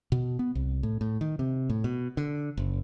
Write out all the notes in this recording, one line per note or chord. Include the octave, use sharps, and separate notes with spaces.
B2
B3
C2
A2
A2
D#3
C3
A2
B2
D3
F#1